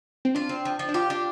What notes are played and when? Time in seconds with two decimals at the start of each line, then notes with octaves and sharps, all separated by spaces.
0.25 C4
0.35 D4 F4
0.49 C4
0.65 F3
0.79 F3
0.88 D4
0.94 F4 G4
1.10 D4